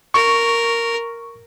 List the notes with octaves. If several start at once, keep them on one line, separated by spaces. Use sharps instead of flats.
A#4 C#6